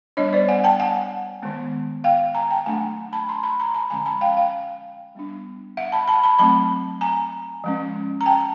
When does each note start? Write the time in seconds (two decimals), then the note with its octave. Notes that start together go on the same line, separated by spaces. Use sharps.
0.17 G3 B3 D4 C#5 D#5
0.33 C5 D5
0.48 F#5 G#5
0.64 G5 A5
0.80 F#5 G#5
1.42 D#3 G#3 B3
2.04 F5 G5
2.35 G#5 A#5
2.50 G5 A5
2.66 F#3 A3 D4 F#5 G#5
3.13 A5 B5
3.28 A#5 C6
3.43 A5 B5
3.60 A#5 C6
3.74 A5 B5
3.90 D3 F3 G#3 C#4 G#5 A#5
4.05 A5 B5
4.21 F5 G5
4.37 F5 G5
5.15 G3 B3 D4
5.77 E5 F#5
5.92 A5 B5
6.08 A5 B5
6.23 A5 B5
6.39 F#3 A3 C4 A5 B5
7.01 G#5 A#5
7.64 F3 G#3 C#4
8.21 A#5
8.26 G5 A5